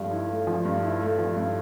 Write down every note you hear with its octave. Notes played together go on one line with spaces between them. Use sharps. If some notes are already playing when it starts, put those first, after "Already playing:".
Already playing: G2 F3 A3
E4
A3
F3
G2
E4
A3
F3
G2